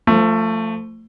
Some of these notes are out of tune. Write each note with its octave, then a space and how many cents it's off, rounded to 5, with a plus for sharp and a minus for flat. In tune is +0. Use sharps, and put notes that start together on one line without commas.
F3 -5 A3 +20